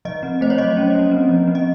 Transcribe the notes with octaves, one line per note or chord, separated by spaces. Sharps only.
F3 D#5
C4
A3 C5
C#5
F#3 D#5
C#4
A#3
C4
F3
C4
D#5